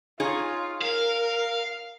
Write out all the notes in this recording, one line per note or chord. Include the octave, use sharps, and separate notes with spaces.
D#4 F4 G#4 C#5
A#4 F5